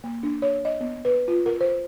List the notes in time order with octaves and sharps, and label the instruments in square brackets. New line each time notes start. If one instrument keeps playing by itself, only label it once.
[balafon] A#3
D4
C#5
D#5
B3
B4
F4
A#4
C5